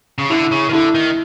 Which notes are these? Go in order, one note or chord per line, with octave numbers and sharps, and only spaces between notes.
C#3
D3 E4
C#3
D#3
D3 E4
D#3